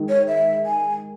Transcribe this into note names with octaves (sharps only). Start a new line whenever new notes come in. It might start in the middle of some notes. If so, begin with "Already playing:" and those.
Already playing: D#3 G#3
C#5
E5
G#5